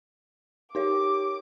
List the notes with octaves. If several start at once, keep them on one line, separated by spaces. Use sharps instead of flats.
D#4 G4 A#4 C#5 D6